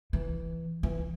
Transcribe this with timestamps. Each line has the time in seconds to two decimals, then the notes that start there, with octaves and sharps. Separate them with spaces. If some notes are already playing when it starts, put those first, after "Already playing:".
0.13 E3
0.83 E3